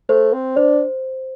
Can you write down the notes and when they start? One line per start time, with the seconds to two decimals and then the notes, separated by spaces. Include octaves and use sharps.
0.09 A3 C5
0.33 C4
0.57 D4 C5